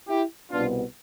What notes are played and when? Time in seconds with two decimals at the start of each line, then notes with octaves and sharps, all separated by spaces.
0.08 E4 G4
0.52 C2 B2 B3 D4 F4